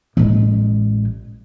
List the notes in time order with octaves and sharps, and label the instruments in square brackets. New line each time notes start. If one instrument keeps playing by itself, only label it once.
[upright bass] A1 G#3